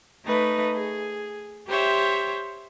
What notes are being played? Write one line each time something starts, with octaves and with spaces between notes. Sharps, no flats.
A3 D#4 B4
G#4
G4 C5 C#5 E5